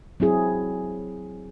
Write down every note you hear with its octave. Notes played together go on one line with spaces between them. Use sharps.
F#3 C4 E4 G#4